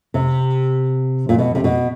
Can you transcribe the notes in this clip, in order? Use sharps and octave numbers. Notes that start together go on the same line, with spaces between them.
C3
A#2
B2
C3
B2